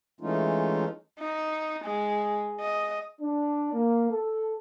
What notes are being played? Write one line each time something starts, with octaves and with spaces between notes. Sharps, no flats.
E3 G#3 A3 C#4 D#4 F4
D#4
G#3
D#5
D4
A#3
A4